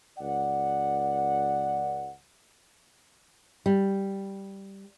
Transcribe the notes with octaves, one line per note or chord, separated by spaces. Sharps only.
C#2 D5 F#5
G3